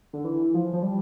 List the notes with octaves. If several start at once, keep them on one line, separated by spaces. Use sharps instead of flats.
D3
E3
F3
F3
G3